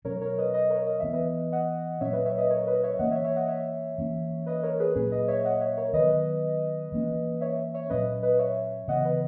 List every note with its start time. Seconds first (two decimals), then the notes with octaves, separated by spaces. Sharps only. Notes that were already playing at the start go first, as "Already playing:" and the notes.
0.05 B2 F#3 C#4 A#4 C#5
0.21 A#4 C#5
0.38 B4 D#5
0.54 B4 D#5
0.70 A#4 C#5
0.87 D#5
1.00 E3 B3 E5
1.13 B4 D#5
1.52 D#5 F#5
2.01 A#2 F#3 C#4 C#5 E5
2.13 B4 D#5
2.25 C#5 E5
2.38 B4 D#5
2.50 A#4 C#5
2.67 B4 D#5
2.83 C#5 E5
2.99 E3 A#3 C#4 D#5 F#5
3.11 C#5 E5
3.24 C#5 E5
3.36 D#5 F#5
3.48 C#5 E5
3.98 E3 A#3 C#4
4.46 B4 D#5
4.63 A#4 C#5
4.79 G#4 B4
4.96 A#2 F#3 A#3 C#4 G#4 B4
5.12 B4 D#5
5.28 C#5 E5
5.44 D#5 F#5
5.61 C#5 E5
5.77 A#4 C#5
5.93 D#3 F#3 B3 B4 D#5
6.92 E3 A#3 C#4
7.41 C#5 E5
7.74 C#5 E5
7.90 A#2 F#3 C#4 B4 D#5
8.22 B4 D#5
8.39 C#5 E5
8.88 C#3 E3 B3 D#5 F#5
9.05 B4 D#5